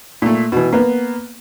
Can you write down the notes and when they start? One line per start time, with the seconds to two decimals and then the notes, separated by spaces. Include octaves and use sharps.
0.22 A#2 A3
0.52 B2 E3
0.73 A#3 B3